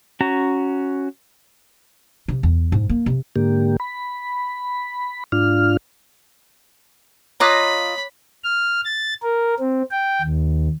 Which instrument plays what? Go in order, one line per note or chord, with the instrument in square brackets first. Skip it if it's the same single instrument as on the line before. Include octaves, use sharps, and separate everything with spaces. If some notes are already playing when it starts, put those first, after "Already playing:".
[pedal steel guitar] C#4 F#4 A#5
[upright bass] C3
E2
G#2
A#3
C3
[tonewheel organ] G#2 D3 A#3 G4
B5
G#2 D4 F4 F6
[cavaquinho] F4 D#5 A#5 [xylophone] C#5 D6 F#6 [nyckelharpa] B5
[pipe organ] F6
A6
A#4
C4
G5
D#2